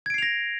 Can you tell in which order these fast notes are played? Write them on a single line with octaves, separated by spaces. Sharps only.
G#6 D7 C7 F7 A#6